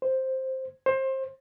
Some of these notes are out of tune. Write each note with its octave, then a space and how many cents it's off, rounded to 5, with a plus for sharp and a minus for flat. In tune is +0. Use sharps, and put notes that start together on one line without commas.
C5 +5
C5 +25